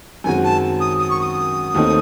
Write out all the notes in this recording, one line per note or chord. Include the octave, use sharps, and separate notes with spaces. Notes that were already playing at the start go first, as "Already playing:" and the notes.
F#2 D#3 G#3 C4 F#4 G#5
A5
D#6
D#6
C#6
D#6
D#2 D#3 A3 C4 D#4